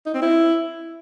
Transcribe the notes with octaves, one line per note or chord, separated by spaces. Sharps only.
D#4
C4
E4